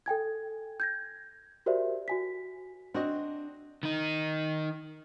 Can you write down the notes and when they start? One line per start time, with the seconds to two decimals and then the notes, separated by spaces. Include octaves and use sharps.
0.06 A4 G5 G#5 G#6
0.80 G6 G#6 A#6
1.66 F#4 G4 A#4 C5 D5 E5
2.08 F#4 G#5 B6
2.94 C4 D4 F#4 D#5
3.83 D#3 D#4